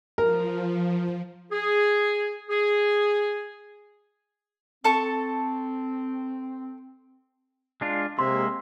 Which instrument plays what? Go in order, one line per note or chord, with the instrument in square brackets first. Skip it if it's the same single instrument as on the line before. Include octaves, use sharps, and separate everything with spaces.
[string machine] F3 [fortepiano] A#4
[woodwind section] G#4
G#4
[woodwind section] C4 [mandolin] A4 A5 C#6
[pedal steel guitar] G#3 D4 F4
[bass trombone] C3 [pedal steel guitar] G#3 A#3 [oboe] E5 [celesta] C6